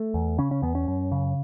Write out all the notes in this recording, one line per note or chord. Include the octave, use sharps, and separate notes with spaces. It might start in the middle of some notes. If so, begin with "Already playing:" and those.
Already playing: A3
E2
C#3 C#4
C#4
E2 B3
C#4
F#2
C#3